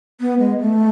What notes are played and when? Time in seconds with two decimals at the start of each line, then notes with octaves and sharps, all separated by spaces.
0.20 B3
0.39 G#3
0.60 A3